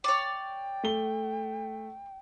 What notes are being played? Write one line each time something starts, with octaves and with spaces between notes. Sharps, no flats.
C#5 D5 G5
A3 G7